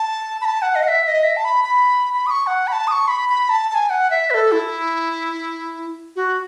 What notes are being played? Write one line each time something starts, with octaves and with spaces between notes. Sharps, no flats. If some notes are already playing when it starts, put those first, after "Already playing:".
Already playing: A5
B5
A5
F#5
D#5
F#5
E5
E5
D#5
E5
A5
B5
B5
B5
D#6
C#6
F#5
B5
A5
D#6
C#6
B5
B5
A5
A5
G#5
F#5
E5
B4
A4
E4
F#4